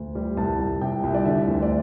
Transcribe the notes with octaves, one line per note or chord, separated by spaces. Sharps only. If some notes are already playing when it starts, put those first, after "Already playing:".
Already playing: D2
G3
C2 A5
C2
C3 G5
C2
D5
D3 E5
D2
D5